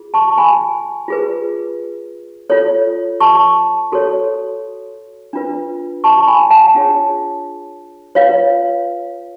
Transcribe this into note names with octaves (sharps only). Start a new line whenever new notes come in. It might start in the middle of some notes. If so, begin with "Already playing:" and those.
Already playing: F4 G#4
A5 C#6
G#5 B5
F4 G#4 B4
F4 A4 C#5
A5 C#6
F#4 A4 C#5
D4 F4 B4
A5 C#6
G#5 B5
F#5 A5
D4 F4 G#4 C#5
F4 B4 C#5 F5